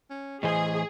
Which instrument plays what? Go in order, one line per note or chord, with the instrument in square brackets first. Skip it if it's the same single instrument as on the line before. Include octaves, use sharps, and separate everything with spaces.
[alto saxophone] C#4
[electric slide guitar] A2 E3 C5 [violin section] G#4 [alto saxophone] D#5